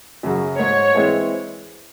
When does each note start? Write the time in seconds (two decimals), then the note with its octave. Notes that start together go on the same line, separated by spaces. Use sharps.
0.23 F#2 C#3 F#3
0.59 G#2 C#5
0.95 E3 G#3 C4 E4